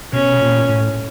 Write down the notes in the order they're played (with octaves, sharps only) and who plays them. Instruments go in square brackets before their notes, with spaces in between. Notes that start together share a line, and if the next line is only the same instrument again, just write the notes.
[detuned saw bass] B2 [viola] C#4
[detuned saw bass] A#2
A2